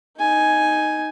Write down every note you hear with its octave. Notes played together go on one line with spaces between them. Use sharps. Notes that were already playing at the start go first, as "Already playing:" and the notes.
D#4 G#5